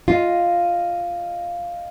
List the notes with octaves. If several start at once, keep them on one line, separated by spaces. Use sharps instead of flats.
F4 D#5 F5